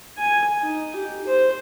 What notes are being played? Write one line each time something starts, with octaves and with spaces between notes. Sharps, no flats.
G#5
D#4
G4
C5